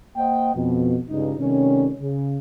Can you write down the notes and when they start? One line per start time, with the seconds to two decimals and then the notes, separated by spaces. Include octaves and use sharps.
0.16 A#3 C5 D#5 F#5 G5
0.55 F2 B2
1.09 C#2 G2 D#4
1.39 C3 D#3 G3 A3 C#4
2.01 C#3